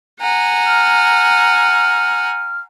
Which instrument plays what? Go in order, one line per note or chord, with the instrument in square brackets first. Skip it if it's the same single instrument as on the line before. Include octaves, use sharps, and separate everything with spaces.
[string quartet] F#5 G#5 A#5
[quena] F6